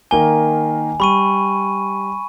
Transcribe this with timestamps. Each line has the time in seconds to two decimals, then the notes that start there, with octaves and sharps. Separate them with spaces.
0.11 D#3 A#3 G#5 G7
1.00 G3 B5 C#6 D#7